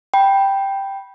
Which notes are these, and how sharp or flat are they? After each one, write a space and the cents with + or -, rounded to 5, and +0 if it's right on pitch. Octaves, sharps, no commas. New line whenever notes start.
G5 +0 B5 -10